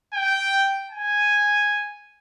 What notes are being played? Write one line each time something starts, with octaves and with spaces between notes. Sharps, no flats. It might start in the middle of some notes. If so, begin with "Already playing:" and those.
G5
G#5